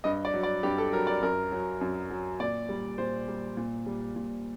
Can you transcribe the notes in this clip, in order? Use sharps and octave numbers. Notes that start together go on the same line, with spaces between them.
G2 D#5
D5
F#3
D5
G2 G4
A4
F#3 A#4
D5
F#2 A#4
F#3
F#2
F#3
A#2 D5
G3
A#2 C5
G3
A#2
G3
A#2